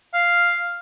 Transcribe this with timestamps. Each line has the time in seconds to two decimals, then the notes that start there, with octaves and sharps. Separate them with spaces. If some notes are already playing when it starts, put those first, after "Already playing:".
0.14 F5